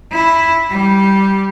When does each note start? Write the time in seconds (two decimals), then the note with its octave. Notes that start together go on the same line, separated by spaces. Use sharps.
0.12 E4
0.71 G3